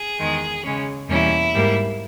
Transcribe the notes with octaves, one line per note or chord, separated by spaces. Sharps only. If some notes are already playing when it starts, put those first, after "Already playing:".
Already playing: G#4
E2 D#3 G#3
C#3 G#3 C#4
E2 B2 G3 A#3 C#4 E4
G#2 G3 A#3